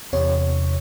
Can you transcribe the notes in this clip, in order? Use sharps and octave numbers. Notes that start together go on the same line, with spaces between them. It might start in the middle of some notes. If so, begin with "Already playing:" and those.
E2 C3 C#5